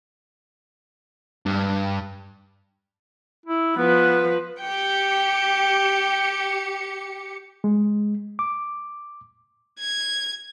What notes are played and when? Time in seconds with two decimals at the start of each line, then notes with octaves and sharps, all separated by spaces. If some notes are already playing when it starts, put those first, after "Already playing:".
1.46 G2
3.46 E4
3.77 F3 B3 B4
4.61 G4 G5 C#7
7.64 G#3
8.39 D6
9.79 G#6